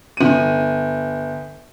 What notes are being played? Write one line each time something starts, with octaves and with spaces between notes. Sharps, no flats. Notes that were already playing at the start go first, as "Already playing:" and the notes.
G1 D#7